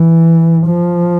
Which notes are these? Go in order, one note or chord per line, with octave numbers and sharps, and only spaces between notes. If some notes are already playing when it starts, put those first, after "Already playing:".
Already playing: E3
F3